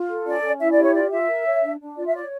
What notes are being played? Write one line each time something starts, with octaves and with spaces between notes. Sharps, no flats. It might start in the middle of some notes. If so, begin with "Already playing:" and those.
Already playing: F4
A4
C#4 D5
C#4
E4 E5
D5
G4
C#5
F4 D5
F4 E5
A#4
C#5
D4
D4
F4 D5
E5
C#5 D5